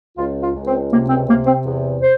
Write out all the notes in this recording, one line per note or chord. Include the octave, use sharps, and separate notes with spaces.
C#2 F4
F4
C#2
C4
C3 A#3
C4
C3 A#3
C4
E2
C5